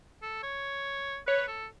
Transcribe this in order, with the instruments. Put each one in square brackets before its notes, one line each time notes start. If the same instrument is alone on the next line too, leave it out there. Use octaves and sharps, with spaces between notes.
[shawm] A4
C#5
[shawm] B4 [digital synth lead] C#5
[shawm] A4